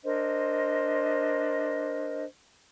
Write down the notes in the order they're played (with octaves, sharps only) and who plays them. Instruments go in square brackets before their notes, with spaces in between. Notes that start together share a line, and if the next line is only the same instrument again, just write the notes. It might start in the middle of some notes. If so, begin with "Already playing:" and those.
[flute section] D4 A#4 C5 D#5